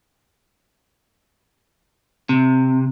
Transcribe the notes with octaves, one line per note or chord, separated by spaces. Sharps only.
C3